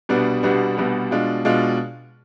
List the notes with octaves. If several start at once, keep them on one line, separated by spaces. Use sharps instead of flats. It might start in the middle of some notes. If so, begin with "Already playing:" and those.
C2 B2 G3 B3 D4
C2 B2 G3 B3 D4
C2 B2 G3 B3 D4
B2 G#3 D4 F4
B2 G#3 D4 F4